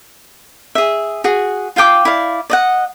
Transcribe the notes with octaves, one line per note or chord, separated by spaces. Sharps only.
G#4 E5
F#4 G#4
F4 F5 G5 D6
E4 D5 F5
D5 D#5 F#5